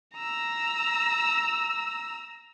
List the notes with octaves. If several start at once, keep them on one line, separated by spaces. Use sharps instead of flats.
A#5 E6